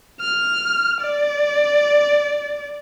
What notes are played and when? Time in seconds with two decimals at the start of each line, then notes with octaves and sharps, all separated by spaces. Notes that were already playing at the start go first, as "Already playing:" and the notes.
0.20 F6
1.01 D5